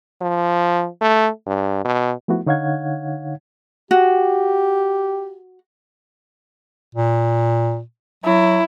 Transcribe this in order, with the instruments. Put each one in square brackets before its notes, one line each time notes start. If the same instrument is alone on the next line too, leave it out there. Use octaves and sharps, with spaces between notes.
[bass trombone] F3
A3
G2
B2
[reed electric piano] F3 A3 B3 E4 F#4
D3 D#4 C#5 F5 F#5 G#6
[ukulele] F#4 [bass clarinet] G4
[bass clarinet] A#2
[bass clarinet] F#3 [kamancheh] E4